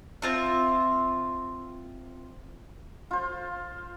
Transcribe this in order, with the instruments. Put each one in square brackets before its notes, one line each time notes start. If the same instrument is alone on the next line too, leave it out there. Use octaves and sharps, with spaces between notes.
[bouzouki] C4 F4 E5
[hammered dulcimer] F4 C5